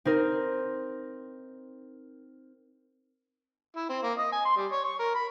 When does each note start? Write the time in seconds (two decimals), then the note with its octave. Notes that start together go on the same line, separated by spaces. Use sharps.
0.05 C4 D#4 A#4
3.76 E4
3.89 C4
4.03 A#3
4.18 D#5
4.32 G#5
4.45 C6
4.57 G3
4.72 C#5
4.84 C#6
4.99 A#4
5.15 B5